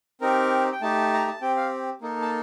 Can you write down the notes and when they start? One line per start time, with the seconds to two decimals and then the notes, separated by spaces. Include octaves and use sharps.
0.21 C4 D#4 G4 A#4
0.72 G5
0.81 A3 D#4 G4 A5
1.13 A#5
1.28 A5
1.41 C4 G4 G5
1.57 F5
2.01 A#3 D#4 A4
2.22 A5